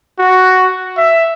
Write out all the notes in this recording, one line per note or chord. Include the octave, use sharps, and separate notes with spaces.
F#4
E5